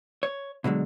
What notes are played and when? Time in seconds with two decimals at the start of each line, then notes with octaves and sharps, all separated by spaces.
0.23 C#5
0.64 B2 D3 F#3 G#3